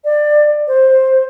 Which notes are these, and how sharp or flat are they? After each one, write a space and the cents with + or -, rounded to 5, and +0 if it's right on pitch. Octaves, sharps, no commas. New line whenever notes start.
D5 +20
C5 +10